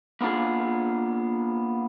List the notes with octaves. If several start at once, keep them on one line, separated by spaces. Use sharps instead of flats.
A#3 B3 D4 F4 G#4